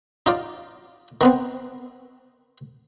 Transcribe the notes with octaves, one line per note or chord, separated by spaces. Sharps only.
D#4 F4 D5
D#3 B3 C4